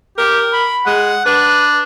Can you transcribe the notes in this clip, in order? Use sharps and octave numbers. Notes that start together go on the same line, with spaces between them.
G4 A#4
B5
G#3 F#5
D4 B4